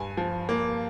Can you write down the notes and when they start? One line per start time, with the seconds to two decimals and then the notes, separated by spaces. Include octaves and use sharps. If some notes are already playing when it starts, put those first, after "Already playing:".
Already playing: G2 G#5
0.17 F3
0.49 A#3